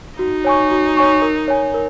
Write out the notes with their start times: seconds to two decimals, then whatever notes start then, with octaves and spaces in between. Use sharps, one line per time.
0.19 D#4 F#4
0.45 C#5 G#5 C#6
0.71 F#4
0.97 C#5 G#5 C#6
1.22 A#4
1.48 C#5 G#5
1.74 A#4